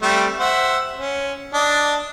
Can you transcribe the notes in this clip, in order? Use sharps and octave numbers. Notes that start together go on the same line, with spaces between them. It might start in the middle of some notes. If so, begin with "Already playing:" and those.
G3 A3 C4
C5 E5 F#5
C#4
D4 D#5